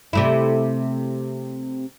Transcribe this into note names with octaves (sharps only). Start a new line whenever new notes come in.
C3 A3 E4